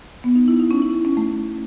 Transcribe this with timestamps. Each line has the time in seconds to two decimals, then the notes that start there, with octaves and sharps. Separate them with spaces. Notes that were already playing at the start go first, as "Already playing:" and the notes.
0.24 B3
0.35 D#4
0.48 E4
0.60 D#4
0.71 C#4
0.82 E4
1.05 C#4
1.17 A3